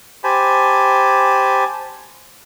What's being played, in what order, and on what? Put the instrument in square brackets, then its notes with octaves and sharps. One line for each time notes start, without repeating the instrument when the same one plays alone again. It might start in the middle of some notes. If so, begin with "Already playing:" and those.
[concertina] G4 C5 G#5 A5 B5